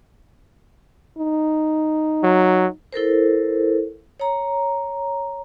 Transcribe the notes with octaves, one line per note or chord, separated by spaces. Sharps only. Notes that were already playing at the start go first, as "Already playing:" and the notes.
D#4
F#3
E4 A4 A#4 C5
C#5 A#5